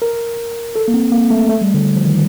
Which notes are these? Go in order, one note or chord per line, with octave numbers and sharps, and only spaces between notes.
A#4
A4
A#3
C4
A#3
A3
A3
G3
D3
F3
D#3